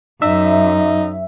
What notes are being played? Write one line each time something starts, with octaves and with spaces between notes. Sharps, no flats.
F#2 D#4 E5